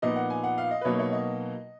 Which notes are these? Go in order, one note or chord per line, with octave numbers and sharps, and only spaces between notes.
A#2 F3 B3 D#4 D#5
F#5
G#5
F#5
F5
D#5
B4
B2 F#3 A#3 D#4 C#5
C#5
D#5